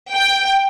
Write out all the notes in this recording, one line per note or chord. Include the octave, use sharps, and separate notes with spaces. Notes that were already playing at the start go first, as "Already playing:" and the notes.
G5